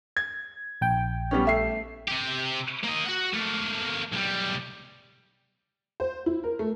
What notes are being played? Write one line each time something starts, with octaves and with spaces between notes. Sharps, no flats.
G#6
A#1 G5
G3 B3 C#4
A3 E5 C7
C3 G4
A#3 D#5
F#4 F#5
A3 A#3
B1 G3
C5
E4
A#4
A3